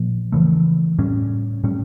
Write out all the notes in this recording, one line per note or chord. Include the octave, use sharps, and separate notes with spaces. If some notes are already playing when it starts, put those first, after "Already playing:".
Already playing: A#2 F3 A#3
C#3 E3 A3
A2 G3 C#4
A2 G3 C#4